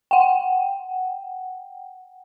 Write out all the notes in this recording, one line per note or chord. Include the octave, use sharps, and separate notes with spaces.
F#5 G5